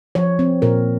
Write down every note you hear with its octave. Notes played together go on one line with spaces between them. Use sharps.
F3 C#5
C4
A#2 A#4